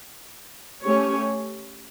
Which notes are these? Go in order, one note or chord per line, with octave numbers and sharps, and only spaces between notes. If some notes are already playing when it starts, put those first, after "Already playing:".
A3 C#4 G4 C#5